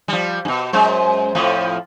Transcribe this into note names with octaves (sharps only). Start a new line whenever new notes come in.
F3 G3
G2 B2
F#2 G#3 C5
F2 A2 F3